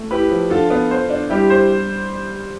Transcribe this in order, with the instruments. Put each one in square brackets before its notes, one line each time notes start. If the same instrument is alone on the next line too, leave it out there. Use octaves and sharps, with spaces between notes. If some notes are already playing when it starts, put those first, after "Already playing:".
Already playing: [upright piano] A3
[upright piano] E4 [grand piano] G4 B4
[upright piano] F3
[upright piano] D3 [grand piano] F4 A4
[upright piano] B3
C5
D4
[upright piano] G3 [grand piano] E4 G4
[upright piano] C5